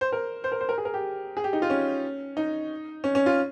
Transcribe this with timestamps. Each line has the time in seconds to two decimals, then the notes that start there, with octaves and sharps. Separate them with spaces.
0.01 C5
0.12 A#4
0.44 C5
0.52 A#4
0.61 C5
0.69 A#4
0.78 G#4
0.85 A#4
0.94 G4
1.37 G#4
1.44 G4
1.53 D#4
1.62 F4
1.70 C#4
2.37 D#4
3.04 C#4
3.15 C#4
3.26 F4